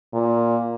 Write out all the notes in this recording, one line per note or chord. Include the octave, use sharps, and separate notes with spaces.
A#2